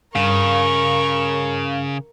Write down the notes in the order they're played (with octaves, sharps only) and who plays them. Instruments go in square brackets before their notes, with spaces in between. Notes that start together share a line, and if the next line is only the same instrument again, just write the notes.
[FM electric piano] G2 F5 [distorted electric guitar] C#3 [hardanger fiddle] A#4 C#6